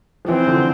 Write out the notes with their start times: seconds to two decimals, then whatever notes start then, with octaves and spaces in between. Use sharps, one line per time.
0.25 F3
0.28 E3 C4
0.47 D3 F3